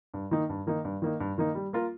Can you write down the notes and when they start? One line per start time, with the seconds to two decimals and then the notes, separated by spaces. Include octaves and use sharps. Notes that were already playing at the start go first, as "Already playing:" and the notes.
0.14 G2
0.31 D#3 A#3 D#4
0.49 G2
0.67 D#3 A#3 D#4
0.84 G2
1.02 D#3 A#3 D#4
1.20 G2
1.38 D#3 A#3 D#4
1.55 G3
1.73 A#3 F4 A#4